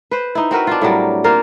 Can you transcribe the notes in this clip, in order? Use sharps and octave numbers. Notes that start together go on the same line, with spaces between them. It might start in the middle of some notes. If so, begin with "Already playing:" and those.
B4 C5
D#4 E4
C4 F#4 A#4 B4
D4 F4
A2 F#3 G3 A#4
A#3 F4 A#4 C5